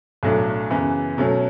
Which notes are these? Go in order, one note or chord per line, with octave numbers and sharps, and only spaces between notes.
B1 A2 F#3 A3 D4
F#2 C#3 E3 B3
B2 F#3 A3 C#4